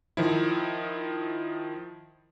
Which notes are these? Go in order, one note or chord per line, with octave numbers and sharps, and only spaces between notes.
D#3 F3 E4